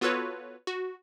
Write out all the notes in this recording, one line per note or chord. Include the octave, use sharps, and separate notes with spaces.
B3 F4 F#4 A4 B4 C#5
F#4